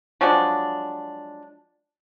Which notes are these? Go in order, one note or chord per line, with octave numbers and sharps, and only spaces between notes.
F3 F#3 G#3 D4